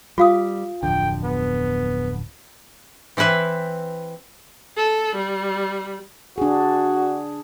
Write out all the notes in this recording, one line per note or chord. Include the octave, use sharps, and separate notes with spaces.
G3 F4 F5 D#6
D1 F2 D3 G5
B3
E3 C4 E4 B4 E5
A4
G3
D4 F#4 G#4